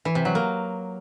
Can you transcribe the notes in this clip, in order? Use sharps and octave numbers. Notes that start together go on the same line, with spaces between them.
E3
C3
F#3
A#3